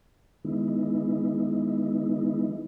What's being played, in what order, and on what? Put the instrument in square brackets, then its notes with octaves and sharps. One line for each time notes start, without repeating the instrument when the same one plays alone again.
[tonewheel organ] D#3 G#3 B3 D#4 E4